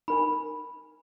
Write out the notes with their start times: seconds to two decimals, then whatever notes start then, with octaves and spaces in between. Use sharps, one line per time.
0.08 D#4 A#4 G#5 B5